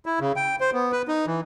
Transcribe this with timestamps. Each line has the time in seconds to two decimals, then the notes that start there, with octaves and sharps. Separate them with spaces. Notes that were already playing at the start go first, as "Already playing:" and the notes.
0.06 E4
0.20 C#3
0.36 G5
0.61 C5
0.73 B3
0.92 B4
1.08 D#4
1.27 E3